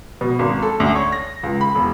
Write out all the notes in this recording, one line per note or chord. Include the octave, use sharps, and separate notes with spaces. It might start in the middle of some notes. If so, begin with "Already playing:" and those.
B2
G#1
A4
D2
C#5
A#6
C#2
B5
E1